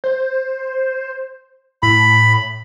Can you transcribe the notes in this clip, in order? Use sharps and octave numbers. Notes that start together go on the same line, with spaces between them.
C5
A2 B5